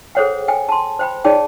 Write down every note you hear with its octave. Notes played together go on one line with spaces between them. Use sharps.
G#4 A4 C5 C#5 F#5 G5
G5 G#5
A5 C6
C5 G5 B5
D#4 G#4 C#5 D5 G5 A5